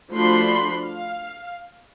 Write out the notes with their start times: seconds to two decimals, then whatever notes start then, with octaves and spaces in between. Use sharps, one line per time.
0.11 F3 A3 D4 F#4 B5 C6
0.84 F5